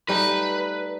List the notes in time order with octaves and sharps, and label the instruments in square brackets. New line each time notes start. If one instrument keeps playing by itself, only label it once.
[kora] G3 A3 D#4 [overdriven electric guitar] B4